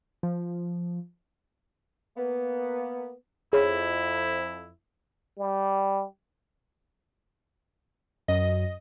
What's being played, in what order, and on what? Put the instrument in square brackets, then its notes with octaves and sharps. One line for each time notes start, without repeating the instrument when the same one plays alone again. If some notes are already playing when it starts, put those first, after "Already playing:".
[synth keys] F3
[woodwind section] A#3 B3
[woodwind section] F2 [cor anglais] E4 [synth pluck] G#4 C#5 B5
[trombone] G3
[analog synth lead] F#2 [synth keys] D#5